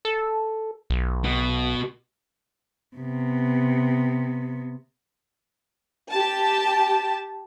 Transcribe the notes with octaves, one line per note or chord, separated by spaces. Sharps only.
A4
B1
B2
C3 B3
G4 A5